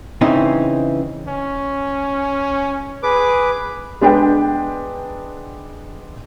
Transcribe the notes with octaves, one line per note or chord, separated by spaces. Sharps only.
C#3 E3 C4 D#4
C#4
G#4 B4 D6
G#3 B3 D4 B4 F#5 G5